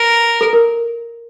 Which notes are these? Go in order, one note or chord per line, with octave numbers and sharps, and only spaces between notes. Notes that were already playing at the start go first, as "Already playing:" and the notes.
Already playing: A#4
A4
A#4